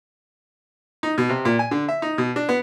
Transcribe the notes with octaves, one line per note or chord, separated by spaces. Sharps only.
D#4
B2
C3
A#2
G#5
D3
E5
D#4
B2
D4
B3